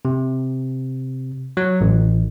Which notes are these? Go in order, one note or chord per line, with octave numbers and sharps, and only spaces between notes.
C3
F#3
A1